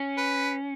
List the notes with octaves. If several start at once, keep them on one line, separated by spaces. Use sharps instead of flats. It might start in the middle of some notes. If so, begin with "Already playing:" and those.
Already playing: C#4
B4